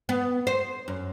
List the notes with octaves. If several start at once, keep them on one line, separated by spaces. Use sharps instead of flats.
B3
C5
F#2